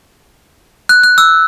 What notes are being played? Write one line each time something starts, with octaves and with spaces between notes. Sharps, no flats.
F#6
F#6
E6